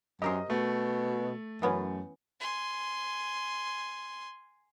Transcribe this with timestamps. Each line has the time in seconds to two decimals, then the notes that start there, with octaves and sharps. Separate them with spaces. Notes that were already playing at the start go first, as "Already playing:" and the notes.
0.22 F#2 G4 A#4 C5 D#5 D#6
0.50 B2 A3
1.62 F#2 E3 B3 C#4
2.40 G#5 C6